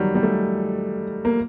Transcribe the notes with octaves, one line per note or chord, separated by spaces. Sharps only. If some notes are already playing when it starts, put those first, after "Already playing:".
Already playing: D#3 F#3 G3
G3
A3
A#3